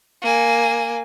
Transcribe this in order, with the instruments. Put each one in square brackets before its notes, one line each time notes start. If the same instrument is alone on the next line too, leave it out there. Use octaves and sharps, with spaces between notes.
[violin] A#3 G#5